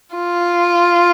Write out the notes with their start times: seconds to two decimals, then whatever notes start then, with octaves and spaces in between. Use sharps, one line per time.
0.15 F4